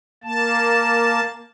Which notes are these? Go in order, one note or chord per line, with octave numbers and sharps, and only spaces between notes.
A#3 A5